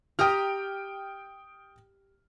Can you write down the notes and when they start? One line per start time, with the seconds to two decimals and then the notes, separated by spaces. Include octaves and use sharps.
0.19 G4 G5 A#5 D#6 F6